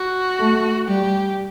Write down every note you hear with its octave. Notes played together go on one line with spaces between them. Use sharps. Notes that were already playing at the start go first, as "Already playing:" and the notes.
Already playing: F#4
A3
G3 G4